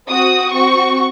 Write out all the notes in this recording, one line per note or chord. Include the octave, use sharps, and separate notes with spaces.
C4 F#4 D#6
C4 F#4 C#6